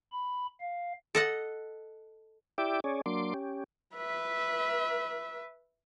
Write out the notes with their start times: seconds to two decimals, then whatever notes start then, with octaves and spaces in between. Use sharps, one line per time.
0.12 B5
0.61 F5
1.15 A4 D#5 F#5
2.58 E4 G4 D5 E5 G5 D6
2.84 C#4 G#4 C#5 D5
3.06 F#3 A#3 D4 C6 D6
3.34 C#4 G4
3.96 B4 E5